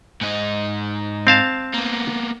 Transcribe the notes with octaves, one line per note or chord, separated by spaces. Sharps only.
G#2 D#4
C4 F5 A5
A#3 B3